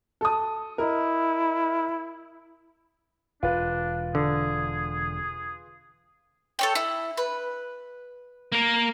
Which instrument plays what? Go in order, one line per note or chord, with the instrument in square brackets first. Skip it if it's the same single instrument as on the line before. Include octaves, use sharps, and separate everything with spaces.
[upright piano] A4 A5 D#6
[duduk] E4 [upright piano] A#4 D#5
[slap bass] E1 [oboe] D4 [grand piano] F4 B4
[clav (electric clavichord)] D3 [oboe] G#4
[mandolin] A4 C#5 G5
E4
B4
[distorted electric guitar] A#3 A#4